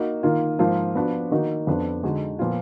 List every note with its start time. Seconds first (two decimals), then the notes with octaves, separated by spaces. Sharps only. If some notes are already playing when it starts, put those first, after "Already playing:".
Already playing: A#3 D#4 F#4
0.23 D#3 A#3 F4
0.59 G#2 F3 A#3 F4
0.95 F3 B3 D4 F#4
1.31 D#3 A#3 D#4 F#4
1.67 F2 F3 B3 D4
2.03 D3 G#3 D#4 F#4
2.39 A#2 F3 B3 F4